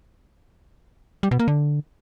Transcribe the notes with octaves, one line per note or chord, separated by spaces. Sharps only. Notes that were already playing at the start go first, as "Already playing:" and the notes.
G3
B2
A#3
D3